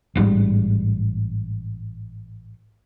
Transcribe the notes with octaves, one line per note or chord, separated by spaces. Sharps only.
A1 G#2 B2 G3